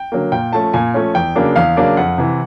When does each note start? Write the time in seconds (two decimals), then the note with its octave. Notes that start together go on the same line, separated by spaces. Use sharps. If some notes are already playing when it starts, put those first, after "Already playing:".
Already playing: G5
0.12 D3 F#3 A#3
0.32 A#2 G5
0.53 F3 A3 C#4 A5
0.74 A#2 G#5
0.94 F3 A3 C#4
1.15 E2 G5
1.36 C#3 F#3 A#3 D4
1.56 E2 F5
1.77 C#3 F#3 A#3 D4
1.97 F2 F#5
2.18 C3 E3